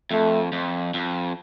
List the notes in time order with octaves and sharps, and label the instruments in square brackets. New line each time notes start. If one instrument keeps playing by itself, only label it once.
[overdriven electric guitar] F2 [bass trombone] A3
[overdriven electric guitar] F2
F2